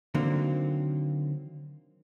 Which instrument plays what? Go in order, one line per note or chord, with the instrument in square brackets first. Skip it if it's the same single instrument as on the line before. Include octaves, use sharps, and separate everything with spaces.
[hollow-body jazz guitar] D3 D#3 F#3 A#3 C4